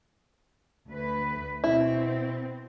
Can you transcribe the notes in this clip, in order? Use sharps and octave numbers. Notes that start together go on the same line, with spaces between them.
D2 B4
B2 C4 E4